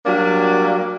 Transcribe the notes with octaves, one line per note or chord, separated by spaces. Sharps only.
F#3 G3 A#3 D4